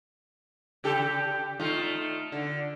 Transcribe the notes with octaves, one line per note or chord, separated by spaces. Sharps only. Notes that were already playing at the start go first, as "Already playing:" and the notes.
C#3 G4 A4
A3 D#4 F4
D3